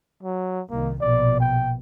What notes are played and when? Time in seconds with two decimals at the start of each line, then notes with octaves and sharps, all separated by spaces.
0.23 F#3
0.70 C2 D#3 A#3
1.01 A#1 B2 D5
1.40 G5